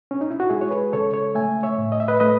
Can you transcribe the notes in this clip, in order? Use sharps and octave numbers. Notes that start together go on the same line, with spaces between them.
C#4
D#4
E4
F#4
G#3 E4 G#4
C#5
G#4 B4
C#3 A4 C#5
A4 C#5
A3 E5 G#5
C#5 E5
A2
D#5
E5
B4 D#5
A3 B4 D#5